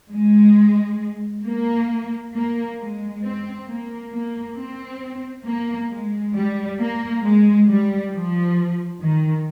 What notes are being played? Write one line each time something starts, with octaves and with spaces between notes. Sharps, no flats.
G#3
A#3
A#3
G#3
C4
A#3
A#3
C4
A#3
G#3
G3
A#3
G#3
G3
F3
D#3